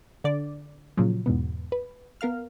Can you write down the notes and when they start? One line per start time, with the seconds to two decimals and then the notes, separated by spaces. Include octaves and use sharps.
0.24 D3 D5
0.97 A#2 C#3 F3 F#3
1.26 E2 G#2 B2 B3
1.72 B4
2.21 B3 A#4 F5 F6